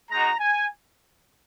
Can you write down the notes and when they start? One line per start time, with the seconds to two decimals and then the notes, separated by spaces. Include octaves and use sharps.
0.10 G#3 D#4 F#4 A#5
0.40 G#5